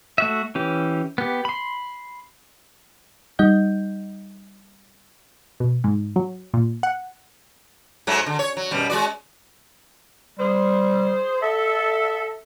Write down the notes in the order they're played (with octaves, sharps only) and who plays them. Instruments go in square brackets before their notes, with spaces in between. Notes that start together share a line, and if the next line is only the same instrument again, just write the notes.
[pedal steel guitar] A3 F#4 E5
E3 C#4 G4
B3 G4
B5 C6
[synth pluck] G3 D#4 D#5 F#5 G6
B2
G#2
F#3
A#2
F#5
[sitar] G#2 F#3 A3
D3
C#5
F#3
F#2 B2 G3
G#3 F#4 D5
[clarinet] G3 [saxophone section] G#4 C5
[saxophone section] A4 [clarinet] E5